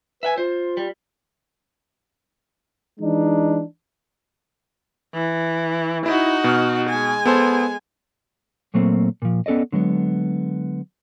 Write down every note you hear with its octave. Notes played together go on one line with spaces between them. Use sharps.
B4 E5 F#5 G#5
F4 C5
G3
E3 G#3 D4 D#4
E3
D#4 E4 F#4
B2 F6
G#3 G#5
B3 A4 C5
A#2 F#3 A3 A#3 C4
A#2 F3
B3 C#4 A4 D5 D#5
D3 F#3 G#3 B3